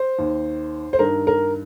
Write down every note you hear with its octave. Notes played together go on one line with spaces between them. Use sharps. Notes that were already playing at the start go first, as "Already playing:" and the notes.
Already playing: C5
D#2 D#3
C5
G2 D#3 A#4
A#4